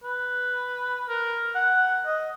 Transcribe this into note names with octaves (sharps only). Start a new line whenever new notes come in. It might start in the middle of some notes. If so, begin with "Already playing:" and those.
B4
A#4
F#5
D#5